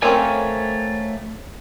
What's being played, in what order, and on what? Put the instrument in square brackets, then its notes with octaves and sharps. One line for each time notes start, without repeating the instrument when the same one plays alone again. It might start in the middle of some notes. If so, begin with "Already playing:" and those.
[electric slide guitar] A3 C#5 G#5 [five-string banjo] A#3 C4 C#4